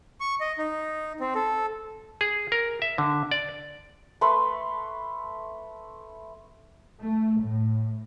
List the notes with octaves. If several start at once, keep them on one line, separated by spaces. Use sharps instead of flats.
C#6
D#5
D#4
C4
A4
G#4
A#4
E5
D3
D5
A3 B4 B5 C6
A3
A2